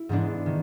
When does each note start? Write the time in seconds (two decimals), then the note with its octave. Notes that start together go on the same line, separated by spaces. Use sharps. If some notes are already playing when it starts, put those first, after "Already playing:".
Already playing: E4
0.09 G#2 E3 G#3 B3 D4
0.46 D#3